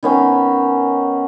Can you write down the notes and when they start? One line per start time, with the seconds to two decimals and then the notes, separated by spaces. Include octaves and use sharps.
0.03 D#3 B3 C#4